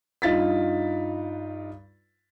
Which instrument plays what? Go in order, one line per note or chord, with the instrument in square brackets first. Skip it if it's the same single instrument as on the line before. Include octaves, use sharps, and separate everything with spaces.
[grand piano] G2 D#4 F4 A6 B6